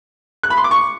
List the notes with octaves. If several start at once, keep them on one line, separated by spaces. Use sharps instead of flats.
F#6
B5
C6
D6
C#6